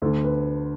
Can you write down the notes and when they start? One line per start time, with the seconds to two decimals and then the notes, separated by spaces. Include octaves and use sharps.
0.02 D2 A4
0.05 D3
0.24 B4